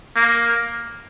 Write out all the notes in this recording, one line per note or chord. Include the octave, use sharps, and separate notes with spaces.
A#3